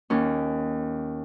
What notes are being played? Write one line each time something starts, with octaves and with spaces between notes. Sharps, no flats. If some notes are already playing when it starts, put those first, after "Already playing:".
D#2 C#4